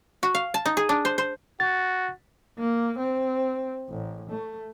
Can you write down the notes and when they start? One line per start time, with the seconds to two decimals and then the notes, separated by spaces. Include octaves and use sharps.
0.23 F#4
0.35 F5
0.54 A5
0.66 D#4
0.77 G#4
0.89 D4
1.05 C5
1.18 C5
1.60 F#4 A6
2.59 A#3
2.98 C4
3.90 A1
4.30 A3